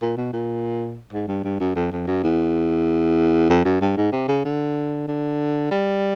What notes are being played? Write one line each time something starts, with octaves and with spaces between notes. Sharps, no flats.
A#2
B2
A#2
G#2
G2
G2
F#2
F2
F2
F#2
E2
F2
F#2
G2
G#2
C3
C#3
D3
D3
G3